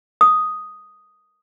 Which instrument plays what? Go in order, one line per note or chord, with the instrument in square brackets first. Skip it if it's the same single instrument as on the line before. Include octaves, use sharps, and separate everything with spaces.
[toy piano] D#6